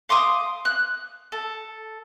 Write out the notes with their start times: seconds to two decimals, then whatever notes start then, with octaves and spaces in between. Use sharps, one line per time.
0.09 F5 C6 D6 D#6
0.65 F#6
1.32 A4